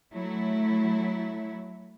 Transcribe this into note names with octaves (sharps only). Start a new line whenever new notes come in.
F#3 A3 E4